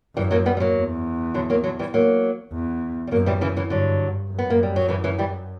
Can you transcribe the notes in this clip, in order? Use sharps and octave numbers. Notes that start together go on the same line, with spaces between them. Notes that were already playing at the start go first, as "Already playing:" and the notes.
F#2 E3 G3
F#3 A#3
G3 B3
G3
F#3 A#3
E2
D3 F#3
F#3 A#3
D3 F#3
E3 G3
F#3 A#3
E2
G3
F#2 F#3 A#3
E3 G3
C#3 E3
C#3 E3
G2 D3 F#3
F#2
B3
A#3
G3
F#3
C#3 E3
C#3 E3
E3 G3